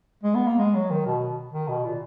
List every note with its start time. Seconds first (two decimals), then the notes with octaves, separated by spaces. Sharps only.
0.23 G#3
0.35 B3
0.47 A#3
0.58 G#3
0.75 F#3
0.90 D#3
1.06 B2
1.52 D#3
1.69 B2
1.85 A#2